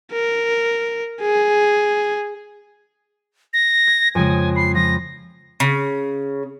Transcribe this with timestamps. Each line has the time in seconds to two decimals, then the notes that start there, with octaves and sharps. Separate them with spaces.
0.12 A#4
1.22 G#4
3.53 A#6
3.87 G#6
4.15 F2 C#3 G#3 G#5
4.56 B5 C7
4.75 F3 A#6
5.60 C#3